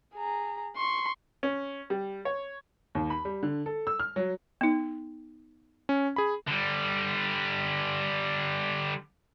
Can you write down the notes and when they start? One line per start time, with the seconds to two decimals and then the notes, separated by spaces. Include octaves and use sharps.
0.15 G#4 A#5
0.76 C6 C#6
1.43 C#4
1.90 G3
2.25 C#5
2.95 D#2
3.10 B5
3.25 G3
3.43 D3
3.66 A4
3.87 E6
3.99 F6
4.16 F#3
4.61 B3 D#4
5.89 C#4
6.16 G#4 B5
6.48 D3 G3